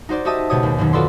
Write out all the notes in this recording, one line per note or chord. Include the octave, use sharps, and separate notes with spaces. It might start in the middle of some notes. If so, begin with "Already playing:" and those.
D#4 F#4 C5 D5
F#4 G4 D#5 E5 A5 D#6
C#2 B2 G4 C#5 D#6
D#2
F#2 B2 D#3
F4 F#4 A4 B4 D5 C6